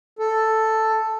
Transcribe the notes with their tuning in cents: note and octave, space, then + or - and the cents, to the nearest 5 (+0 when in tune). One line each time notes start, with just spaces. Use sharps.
A4 +5